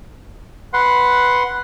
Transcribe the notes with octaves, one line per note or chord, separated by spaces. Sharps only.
B4 F#5 C6